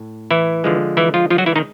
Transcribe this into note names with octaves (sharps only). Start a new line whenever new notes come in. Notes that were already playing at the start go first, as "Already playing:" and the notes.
Already playing: A2
E3 E4
D3 F3 G#3
E3 E4
F3 F4
F3 F4
F#3 F#4
E3 E4
D#3 D#4